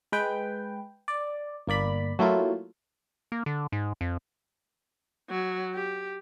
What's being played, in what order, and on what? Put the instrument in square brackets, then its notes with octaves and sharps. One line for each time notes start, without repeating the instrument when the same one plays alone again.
[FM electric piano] G#3 B4 G5
D5
G1 A#3 D5 B5
F#3 A3 A#3 E4 F4
[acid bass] A#3
D3
G#2
F2
[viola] F#3
G4